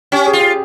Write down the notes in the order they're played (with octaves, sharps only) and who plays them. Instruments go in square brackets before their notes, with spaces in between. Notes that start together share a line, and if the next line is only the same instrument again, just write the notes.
[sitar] C#4 [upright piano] G4
[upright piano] G#4
[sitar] F4
[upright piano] G4